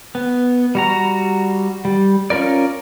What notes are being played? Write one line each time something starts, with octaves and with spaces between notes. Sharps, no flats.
B3
G3 F#4 A#5
G3
C#4 F4 A#4 D5